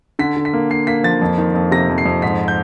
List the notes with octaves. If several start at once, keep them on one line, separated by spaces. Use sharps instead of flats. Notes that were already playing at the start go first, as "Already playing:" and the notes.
D3 B6
D3
B6
A#3
A#3 C7
A#3 B6
F3 A6
F2
D#3
F2
C3 A#6
F2
C7
F2
G#2 B6
G6